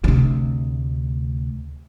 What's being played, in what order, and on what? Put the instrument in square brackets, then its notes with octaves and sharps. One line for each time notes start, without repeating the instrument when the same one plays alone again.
[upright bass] D2 C3